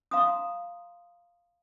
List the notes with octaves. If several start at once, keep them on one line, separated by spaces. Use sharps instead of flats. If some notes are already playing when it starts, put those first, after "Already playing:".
F5 A#5 C6 D#6